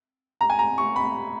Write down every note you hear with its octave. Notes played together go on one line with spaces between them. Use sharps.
A#5
G#5
A#5
C#6
B5